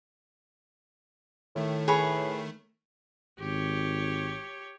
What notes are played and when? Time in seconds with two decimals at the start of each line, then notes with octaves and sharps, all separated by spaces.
1.56 A2 D#3 A3
1.88 G#4 B4 C#5 B5
3.40 G#1 G4 C#5